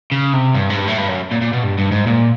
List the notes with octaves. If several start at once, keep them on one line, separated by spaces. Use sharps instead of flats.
C#3
C3
G2
G#2
G2
A2
G2
F#2
A#2
A#2
B2
G2
G2
G#2
A#2